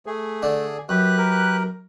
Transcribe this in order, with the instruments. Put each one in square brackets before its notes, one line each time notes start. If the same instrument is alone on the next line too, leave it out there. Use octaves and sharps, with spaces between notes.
[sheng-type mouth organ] A3 [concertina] G#4
[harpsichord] D3 D4
[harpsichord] F#2 [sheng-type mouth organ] G4 B4 F#6
[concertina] A#4